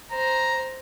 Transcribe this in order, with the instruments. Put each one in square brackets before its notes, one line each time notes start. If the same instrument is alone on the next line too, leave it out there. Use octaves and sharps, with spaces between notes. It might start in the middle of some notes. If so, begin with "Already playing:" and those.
[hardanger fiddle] C5 [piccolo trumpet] A#5